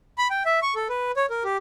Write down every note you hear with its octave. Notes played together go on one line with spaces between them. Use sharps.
B5
G5
E5
C#6
A4
B4
C#5
A#4
G4